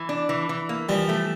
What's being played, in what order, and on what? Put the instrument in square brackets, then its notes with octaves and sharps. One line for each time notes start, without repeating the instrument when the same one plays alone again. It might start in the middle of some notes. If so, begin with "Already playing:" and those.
Already playing: [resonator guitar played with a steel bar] E3
D4
E3
E3
A#3
[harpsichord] E3 G3 [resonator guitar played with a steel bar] F3
[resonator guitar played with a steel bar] A3